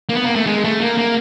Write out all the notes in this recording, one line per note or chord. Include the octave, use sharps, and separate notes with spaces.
A#3
B3
A#3
A3
G#3
A3
A#3
A#3